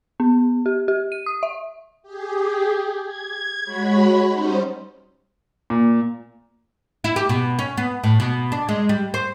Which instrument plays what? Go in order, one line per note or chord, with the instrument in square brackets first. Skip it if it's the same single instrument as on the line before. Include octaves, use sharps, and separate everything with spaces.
[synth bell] B3
G4
G4
D#7
D#6
E5
[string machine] G4 G#4
G#6
G#3 F#4 C#5 B5
G3 C#4 D#4 C5
[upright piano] A#2
[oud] E4
G4
B2
C#4
B3
A2
B2
D4
G#3
G3
C5